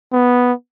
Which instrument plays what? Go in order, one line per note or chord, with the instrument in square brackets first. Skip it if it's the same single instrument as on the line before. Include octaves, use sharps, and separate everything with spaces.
[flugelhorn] B3